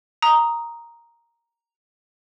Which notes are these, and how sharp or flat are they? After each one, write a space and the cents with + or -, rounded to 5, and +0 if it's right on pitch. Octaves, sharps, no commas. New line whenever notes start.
A#5 +0 D#6 +0